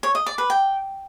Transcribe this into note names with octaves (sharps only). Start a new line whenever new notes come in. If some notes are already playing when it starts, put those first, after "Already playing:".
C#5
D#5
D5
B4
G5